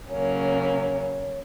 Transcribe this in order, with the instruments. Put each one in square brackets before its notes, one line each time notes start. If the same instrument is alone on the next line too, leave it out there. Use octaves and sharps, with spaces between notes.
[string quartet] C#3 F#3 A#3 C#4 [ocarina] C#5